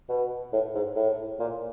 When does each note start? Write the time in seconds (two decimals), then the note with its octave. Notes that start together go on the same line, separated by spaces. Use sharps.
0.09 B2
0.52 A2
0.74 G#2
0.96 A2
1.39 A#2